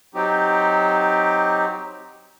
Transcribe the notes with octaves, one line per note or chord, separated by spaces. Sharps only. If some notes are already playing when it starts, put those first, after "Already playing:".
F#3 C4 D#4 G4